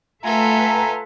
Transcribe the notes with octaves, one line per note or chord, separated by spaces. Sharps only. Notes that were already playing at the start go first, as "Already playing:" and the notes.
A3 F4 A4 B4 E5 F#5 G#5 A#5